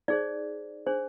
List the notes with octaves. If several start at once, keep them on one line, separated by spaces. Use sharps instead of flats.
D#4 G#4 C5 D5
D4 G#4 C5